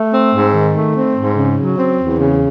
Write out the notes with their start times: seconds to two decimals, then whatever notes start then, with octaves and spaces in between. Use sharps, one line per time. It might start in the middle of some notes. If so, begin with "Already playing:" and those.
Already playing: A3
0.14 C4
0.34 G#2
0.55 D#3
0.75 A3
0.96 C4
1.16 G#2
1.36 C#3
1.57 F#3
1.78 C4
1.98 E2
2.18 C#3